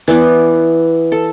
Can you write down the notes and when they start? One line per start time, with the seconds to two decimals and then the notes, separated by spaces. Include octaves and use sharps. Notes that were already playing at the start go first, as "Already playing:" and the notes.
0.08 E3 B3 D5
1.12 A4